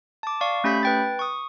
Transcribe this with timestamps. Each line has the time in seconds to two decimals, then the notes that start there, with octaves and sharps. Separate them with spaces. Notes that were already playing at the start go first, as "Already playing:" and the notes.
0.23 A5 D6
0.41 D5 F5 C#6
0.64 A3 C#4 G4 B5 G6 B6
0.83 B4 G5 A6
1.19 C#6 D#6